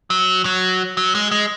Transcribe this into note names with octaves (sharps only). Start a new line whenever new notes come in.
F#3
F#3
F#3
G#3
G#3